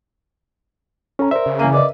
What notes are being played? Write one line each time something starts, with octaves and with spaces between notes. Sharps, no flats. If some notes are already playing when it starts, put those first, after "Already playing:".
C#4 A4 A#5
A#4 C5 D5 E5
C#3
E3 A#3 G#5 D#7
B4 D5 D#5